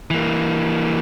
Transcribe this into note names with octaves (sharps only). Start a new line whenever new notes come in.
E3 A#3